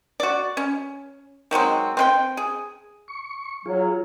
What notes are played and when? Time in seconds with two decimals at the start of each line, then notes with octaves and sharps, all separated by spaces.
0.20 F#4 D5
0.57 C#4
1.51 D#3 F#3 G#3 C4
1.97 C4 B4 G5
2.37 G#4
3.08 C#6
3.66 F#3 F4 G#4